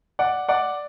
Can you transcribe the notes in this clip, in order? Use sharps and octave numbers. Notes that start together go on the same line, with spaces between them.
D5 F#5
D5 F#5